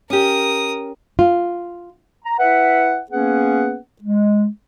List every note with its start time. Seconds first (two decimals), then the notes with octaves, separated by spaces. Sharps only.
0.10 C#4 G4 A#4 D#6
1.19 F4
2.25 A#5
2.38 E4 B4 E5 F#5
3.10 A#3 B3 C#4 G#4 B4 F#5
4.02 G#3